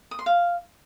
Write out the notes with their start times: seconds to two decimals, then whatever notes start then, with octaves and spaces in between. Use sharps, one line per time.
0.11 D#6
0.19 C6
0.26 F5